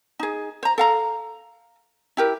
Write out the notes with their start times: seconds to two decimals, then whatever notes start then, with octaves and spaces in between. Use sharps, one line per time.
0.19 D#4 G#4
0.63 C5 A#5
0.78 A4 F5 A#5
2.17 E4 G4 A#4